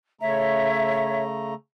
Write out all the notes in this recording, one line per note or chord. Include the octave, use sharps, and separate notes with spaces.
C#3 A3 C#5 E5 A#5